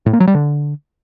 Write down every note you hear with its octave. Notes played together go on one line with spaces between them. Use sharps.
A2
A#3
F#3
G3
D3